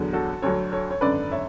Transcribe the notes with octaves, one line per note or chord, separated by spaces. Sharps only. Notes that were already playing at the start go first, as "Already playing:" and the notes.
Already playing: E2 D3 F#3
F#4 A4
D2 D3 F#3 A4 C#5
A4 C#5
C#5
G#1 F#2 D3 B4 D5
C#5 E5